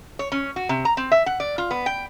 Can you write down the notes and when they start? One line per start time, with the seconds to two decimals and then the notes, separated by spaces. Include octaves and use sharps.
0.19 C#5
0.32 C#4
0.56 F#4
0.69 C3
0.85 A#5
0.97 C4
1.12 E5
1.26 F#5
1.40 D5
1.58 F4
1.71 B3
1.86 G5